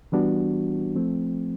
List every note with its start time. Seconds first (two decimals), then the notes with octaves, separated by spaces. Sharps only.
0.12 E3 G3 B3 D4 F#4
0.95 F3 A3 C4